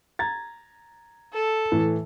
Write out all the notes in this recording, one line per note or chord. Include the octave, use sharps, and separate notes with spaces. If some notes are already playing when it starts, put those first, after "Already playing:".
A#5 G#6 A6
A4
A2 E3